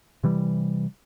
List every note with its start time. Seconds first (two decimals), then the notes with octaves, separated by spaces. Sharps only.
0.24 C3 E3 G3